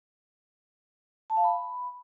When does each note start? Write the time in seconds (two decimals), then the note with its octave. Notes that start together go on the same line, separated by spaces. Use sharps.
1.30 A5
1.37 F5
1.44 B5